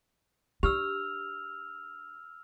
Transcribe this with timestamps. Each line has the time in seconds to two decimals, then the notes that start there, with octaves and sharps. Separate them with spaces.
0.63 D4 G4 E6 F6 F7